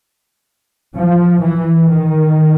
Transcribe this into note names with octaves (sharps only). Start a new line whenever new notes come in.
F3
E3
D#3